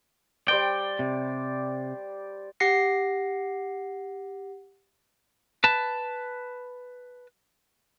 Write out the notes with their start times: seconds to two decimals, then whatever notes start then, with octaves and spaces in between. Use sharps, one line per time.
0.48 G3 C5 D5 G5
0.99 C3
2.60 G4 F#5 A#6 C7 C#7
5.64 B4 A5